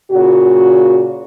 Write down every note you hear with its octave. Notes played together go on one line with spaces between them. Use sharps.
A#2 C#3 F#4